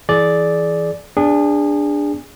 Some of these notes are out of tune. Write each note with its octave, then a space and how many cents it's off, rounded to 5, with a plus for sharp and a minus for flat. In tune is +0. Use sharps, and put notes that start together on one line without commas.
E3 +0 G#4 +30 D5 +0
B3 +35 D4 +0 G#4 -30